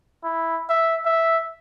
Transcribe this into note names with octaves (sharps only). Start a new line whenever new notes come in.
E4
E5
E5